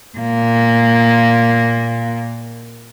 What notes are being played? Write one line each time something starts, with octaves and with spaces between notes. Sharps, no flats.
A#2 A#3